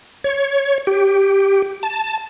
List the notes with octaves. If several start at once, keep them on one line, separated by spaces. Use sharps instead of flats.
C#5
G4
A5